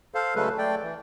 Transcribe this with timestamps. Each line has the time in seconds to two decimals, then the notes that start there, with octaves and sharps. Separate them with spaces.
0.14 A4 C5 F5
0.35 C#3 F#3 G#3 A3 A4 B4
0.58 A3 D5 G5
0.83 E3